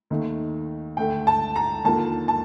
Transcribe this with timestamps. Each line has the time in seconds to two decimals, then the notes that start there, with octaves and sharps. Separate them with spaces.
0.10 D#2 D#3 A3
0.97 D2 D3 A3 G5
1.27 A5
1.56 A#5
1.84 D#2 D3 F3 A#3 A5
2.28 A5